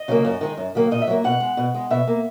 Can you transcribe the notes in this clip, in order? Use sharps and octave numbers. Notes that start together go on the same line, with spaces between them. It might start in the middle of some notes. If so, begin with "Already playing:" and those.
Already playing: D#5
C#3 F#3 A#3
F#2
D#3 G#3
F#2
D#3 F#3 A#3
A#2 D#5
E5
F#3 A#3
B2 F#5
G#3
B2
G#3
B2 E5
A#3